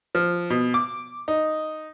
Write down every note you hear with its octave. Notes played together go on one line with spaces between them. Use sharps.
F3
B2
D6
D#4